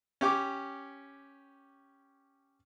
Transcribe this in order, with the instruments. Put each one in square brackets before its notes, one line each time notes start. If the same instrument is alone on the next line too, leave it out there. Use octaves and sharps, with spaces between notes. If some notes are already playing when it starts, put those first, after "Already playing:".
[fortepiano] C#4 G4 D6